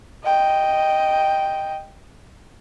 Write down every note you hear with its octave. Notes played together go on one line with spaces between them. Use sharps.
D#5 G5